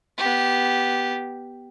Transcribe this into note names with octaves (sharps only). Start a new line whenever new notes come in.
B3 G4